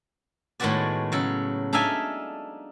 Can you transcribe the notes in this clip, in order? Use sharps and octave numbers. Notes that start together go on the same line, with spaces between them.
A2 D#3 G#3 B3 F#4 D5
C#3 F#3 A4
D4 D#4 A4 E5 F5 G#5